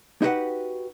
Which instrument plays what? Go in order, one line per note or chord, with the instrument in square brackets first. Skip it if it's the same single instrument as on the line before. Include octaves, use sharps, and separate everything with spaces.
[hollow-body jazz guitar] D#4 E4 F#4 G4 B4 F#5